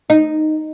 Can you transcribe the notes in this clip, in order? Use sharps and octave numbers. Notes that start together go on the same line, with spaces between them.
D#4